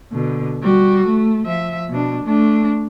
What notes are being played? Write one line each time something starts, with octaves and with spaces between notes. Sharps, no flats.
B2 D3
G3 F#4
A3
F3 E5
B2 D4
A3 D4